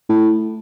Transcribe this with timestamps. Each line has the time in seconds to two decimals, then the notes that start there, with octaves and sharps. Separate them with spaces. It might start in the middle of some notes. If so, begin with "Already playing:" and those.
0.09 A2